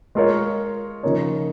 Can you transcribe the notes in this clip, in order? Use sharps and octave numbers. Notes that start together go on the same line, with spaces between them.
G#3 F4 A#4 C#5
C#3 F3 A#3 D#4 C#5